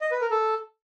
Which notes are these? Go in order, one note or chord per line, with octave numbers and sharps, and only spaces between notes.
D#5
B4
A#4
A4